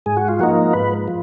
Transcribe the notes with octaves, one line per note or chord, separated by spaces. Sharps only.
G#2 G#4
F#4
F4
F3 A#3 D#4 F#4
G#2 B4
F3